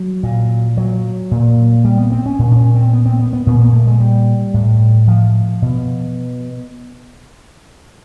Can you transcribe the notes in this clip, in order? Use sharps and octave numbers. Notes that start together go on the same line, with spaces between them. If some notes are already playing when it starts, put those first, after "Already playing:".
Already playing: F#3
A#2
F#3
A#2
G3
B3
C4
C#4
A#2
D4
C#4
C4
B3
C4
B3
B3
A#2 B3
A#3
A3
G#3
G3
A2
F3
B2